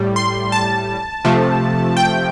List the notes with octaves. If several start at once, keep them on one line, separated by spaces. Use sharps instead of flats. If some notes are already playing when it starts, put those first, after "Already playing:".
Already playing: A2 G3
C6
A5
C3 F3 A3
G5